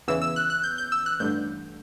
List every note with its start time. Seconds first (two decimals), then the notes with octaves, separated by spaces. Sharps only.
0.08 E2 C#3 E3 E6
0.22 E6
0.36 F#6
0.50 F#6
0.63 G6
0.78 G6
0.92 E6
1.06 F#6
1.20 A1 G2 D3 G6